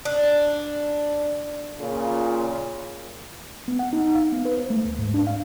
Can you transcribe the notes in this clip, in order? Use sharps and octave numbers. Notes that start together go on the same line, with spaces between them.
D4
A#2 C#3 F4
B3
F#5
D#4
F5
B3
B4
C5
A3
D2
G#2
D4
F5